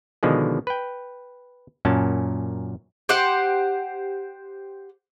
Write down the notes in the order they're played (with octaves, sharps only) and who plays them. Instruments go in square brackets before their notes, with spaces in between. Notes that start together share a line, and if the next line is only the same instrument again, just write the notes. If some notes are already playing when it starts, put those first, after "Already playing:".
[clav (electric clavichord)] B2 D3 D#3 F3 G#3
B4 G5
F#2 A#2 C#4 A5
[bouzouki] G4 C5 F#5